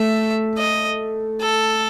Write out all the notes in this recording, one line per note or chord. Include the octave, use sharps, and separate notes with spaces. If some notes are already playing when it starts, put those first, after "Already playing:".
Already playing: A3 A4 E5
D#5
A4